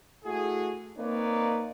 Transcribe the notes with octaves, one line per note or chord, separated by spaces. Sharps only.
A3 E4 F#4 G#4
A#3 C4 D#4 B4 C#5 D5